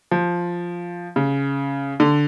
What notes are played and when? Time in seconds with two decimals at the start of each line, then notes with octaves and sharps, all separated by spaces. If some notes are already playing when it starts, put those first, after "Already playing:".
0.11 F3
1.16 C#3
2.00 D3